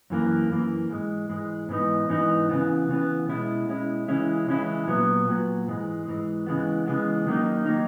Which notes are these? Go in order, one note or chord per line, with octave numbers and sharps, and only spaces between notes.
F#2 E3 A#3
F#2 E3 A#3
G#2 E3 G#3
G#2 E3 G#3
G#2 E3 B3 D#4
G#2 E3 B3 D#4
C#3 E3 B3
C#3 E3 B3
B2 G#3 C#4 E4
B2 G#3 C#4 E4
C#3 E3 G#3 C#4 E4
C#3 E3 G#3 C#4 E4
A#2 F#3 B3
A#2 F#3 B3
G#2 E3 G#3
G#2 E3 G#3
C#3 E3 G#3 B3
C#3 E3 G#3 B3
D#3 F#3 A#3 D#4
D#3 F#3 A#3 D#4